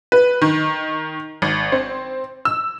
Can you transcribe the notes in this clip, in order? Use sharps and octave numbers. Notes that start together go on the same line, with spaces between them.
B4
D#3
G#1
C4
E6